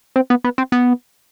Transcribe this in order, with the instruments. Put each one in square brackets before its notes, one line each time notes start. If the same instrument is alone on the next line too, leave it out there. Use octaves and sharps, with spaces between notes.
[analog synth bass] C4
B3
B3
C4
B3